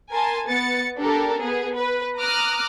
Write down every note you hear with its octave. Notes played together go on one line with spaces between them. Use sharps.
A#4 G#5 A5 C6
B3 A6 C#7
D4 G4 A4 A#4
B3 G#4
B4
A#5 D6 D#6 F6 F#6